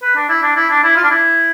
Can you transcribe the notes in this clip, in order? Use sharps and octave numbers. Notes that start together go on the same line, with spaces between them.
B4
D4
E4
D4
E4
D4
E4
F4
D4
E4